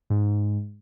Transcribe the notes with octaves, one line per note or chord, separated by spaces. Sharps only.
G#2